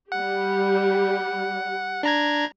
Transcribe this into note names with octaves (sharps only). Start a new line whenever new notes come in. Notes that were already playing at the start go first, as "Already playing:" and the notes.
G3 G4 F#5
D4 A#5 G#6